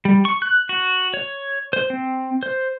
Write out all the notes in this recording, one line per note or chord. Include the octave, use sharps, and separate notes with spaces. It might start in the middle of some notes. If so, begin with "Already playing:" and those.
G3
C#6
F#6
F#4
C#5
C5
C4
C5